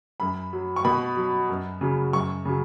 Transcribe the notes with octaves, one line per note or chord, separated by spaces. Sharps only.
F#2 B5
F#3
C#6
B2 B5
F#3
F#2
C#3 F#3
F#2 C#6
C#3 F#3